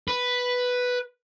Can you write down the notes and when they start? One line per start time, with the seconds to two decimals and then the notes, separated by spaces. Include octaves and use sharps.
0.08 B4